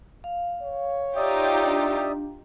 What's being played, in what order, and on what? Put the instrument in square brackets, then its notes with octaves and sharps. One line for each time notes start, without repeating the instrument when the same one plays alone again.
[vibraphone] F5
[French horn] C#5
[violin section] D#4 F4 G4 [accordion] D5 E5 D#6
[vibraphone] D4